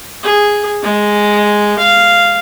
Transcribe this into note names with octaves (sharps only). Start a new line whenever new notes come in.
G#4
G#3
F5